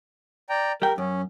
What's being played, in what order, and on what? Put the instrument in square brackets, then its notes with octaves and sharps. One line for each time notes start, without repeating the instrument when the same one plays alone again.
[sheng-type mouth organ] D5 G5 A#5
[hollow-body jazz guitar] G3 G5 [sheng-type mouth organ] A#4
[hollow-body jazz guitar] F#2 [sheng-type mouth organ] C#4